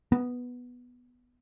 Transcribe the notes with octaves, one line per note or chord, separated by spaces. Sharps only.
B3